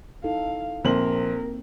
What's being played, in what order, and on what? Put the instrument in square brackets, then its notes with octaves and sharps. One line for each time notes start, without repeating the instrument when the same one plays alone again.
[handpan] D#4 E4 A4 [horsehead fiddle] F5
[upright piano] A#1 C5 F#7 [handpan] A#3 C4 [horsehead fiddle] A#4